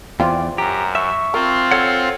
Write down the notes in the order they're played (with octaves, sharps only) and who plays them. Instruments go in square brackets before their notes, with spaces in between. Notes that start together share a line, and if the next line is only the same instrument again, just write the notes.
[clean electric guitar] E2 [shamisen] C4 F4 [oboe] D5
[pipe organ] F#2 [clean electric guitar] G4 [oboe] A#5
[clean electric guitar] E5 [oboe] C#6
[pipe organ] C4 F4 [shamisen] A#4
[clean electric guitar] A4 C#5 F#5